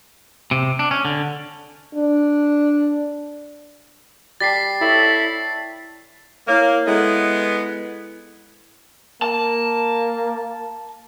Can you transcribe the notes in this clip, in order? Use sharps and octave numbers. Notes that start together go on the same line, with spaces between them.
C3
D4
C#4
D3
D4
G3 G5 A5 A6 B6 C7
E4 A4 C#5 A5
A#3 E4 C#5 F5
G#3 B3 E4 A4 E5
A#3 A5